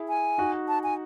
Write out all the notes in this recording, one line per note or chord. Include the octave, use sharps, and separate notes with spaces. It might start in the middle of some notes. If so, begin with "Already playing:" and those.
Already playing: E4 G#4
G#5
D#4 F#4
A5
G#5